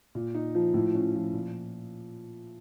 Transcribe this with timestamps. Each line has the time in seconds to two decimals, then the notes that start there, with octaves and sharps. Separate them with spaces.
0.15 A#2
0.35 D#4
0.55 F3
0.74 A2
0.94 C#4
1.15 F3
1.33 A#2